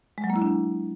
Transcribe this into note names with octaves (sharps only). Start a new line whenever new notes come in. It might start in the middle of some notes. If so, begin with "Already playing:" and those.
G#3
F#3
A#3
E4
D4